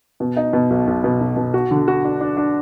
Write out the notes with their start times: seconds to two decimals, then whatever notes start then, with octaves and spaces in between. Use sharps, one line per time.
0.20 B2
0.37 D#4
0.53 B2
0.70 B1
0.87 B1
1.04 B2
1.20 B1
1.36 B2
1.54 F#4
1.71 D3
1.88 F#4
2.05 D4
2.21 D4
2.37 D4